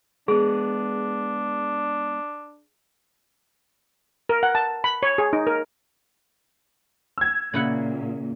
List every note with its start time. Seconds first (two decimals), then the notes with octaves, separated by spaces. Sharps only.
0.28 G#3 B3 D4 G#4
4.29 A#4
4.43 F#5
4.55 A5
4.84 B5
5.03 C#5
5.18 G#4
5.33 D#4
5.47 A#4
7.18 E6 G#6
7.54 A#2 C#3 E4 F#5